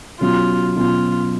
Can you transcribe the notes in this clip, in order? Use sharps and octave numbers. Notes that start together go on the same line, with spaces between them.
B2 F#3 C#4 F4
B2 F#3 C#4 F4